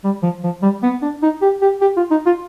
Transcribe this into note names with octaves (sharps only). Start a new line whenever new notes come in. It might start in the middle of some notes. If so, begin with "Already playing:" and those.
G3
F3
F3
G3
B3
D4
D#4
G4
G4
G4
F4
D#4
F4